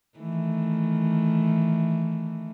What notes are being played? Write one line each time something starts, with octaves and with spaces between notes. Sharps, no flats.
D#3 E3 A3